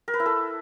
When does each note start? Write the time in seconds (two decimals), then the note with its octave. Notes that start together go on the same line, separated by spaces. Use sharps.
0.08 A#4
0.14 B4
0.20 E4
0.26 A4